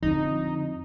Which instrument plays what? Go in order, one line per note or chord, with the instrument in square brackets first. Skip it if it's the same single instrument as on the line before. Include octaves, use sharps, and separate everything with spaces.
[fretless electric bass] F2 [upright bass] D3 [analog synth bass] D#4